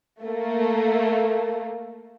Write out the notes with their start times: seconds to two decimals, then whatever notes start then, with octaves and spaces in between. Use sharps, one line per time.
0.23 A3 A#3